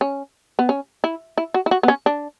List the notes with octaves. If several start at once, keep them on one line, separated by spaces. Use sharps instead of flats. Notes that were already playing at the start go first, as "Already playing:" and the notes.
C#4
B3
C#4
E4
E4
F#4
E4
F#4
B3
C#4
D4